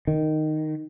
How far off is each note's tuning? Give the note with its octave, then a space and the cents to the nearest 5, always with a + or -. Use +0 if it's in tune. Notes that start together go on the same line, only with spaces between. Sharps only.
D#3 -5